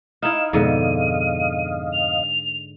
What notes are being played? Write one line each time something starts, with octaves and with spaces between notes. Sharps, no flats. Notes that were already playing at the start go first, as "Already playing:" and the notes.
D#4 E4 D#5 F5 E7
F2 G#2 B2 D3 D#7
F7